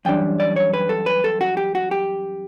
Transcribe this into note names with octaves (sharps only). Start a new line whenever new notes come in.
F#2 E3 G3 D4 G5
D5
C#5
B4
A4
B4
A4
F#4
G4
F#4
G4